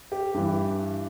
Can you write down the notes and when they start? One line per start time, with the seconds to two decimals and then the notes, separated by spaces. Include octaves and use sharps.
0.12 G4
0.34 G2 E3